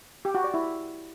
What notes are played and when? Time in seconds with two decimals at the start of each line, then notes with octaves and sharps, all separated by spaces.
0.25 G4
0.35 F#4
0.44 D5
0.54 E4